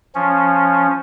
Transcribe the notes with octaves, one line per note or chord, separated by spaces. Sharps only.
F3 C#4